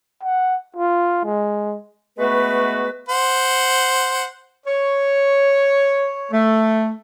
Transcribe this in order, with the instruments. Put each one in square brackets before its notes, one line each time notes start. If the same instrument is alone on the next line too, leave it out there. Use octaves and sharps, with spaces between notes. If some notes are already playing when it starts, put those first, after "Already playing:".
[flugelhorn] F#5
F4
G#3
[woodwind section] G#3 A3 B3 F#4 B4
[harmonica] C5 F#5
[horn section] C#5
A3